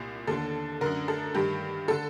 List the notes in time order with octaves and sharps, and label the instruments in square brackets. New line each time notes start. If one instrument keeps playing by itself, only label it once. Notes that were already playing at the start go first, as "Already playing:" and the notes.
Already playing: [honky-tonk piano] C2 A#2
D#2 D3 A4
F#2 D3 A#4
A4
G2 D#3 G4
D3 A4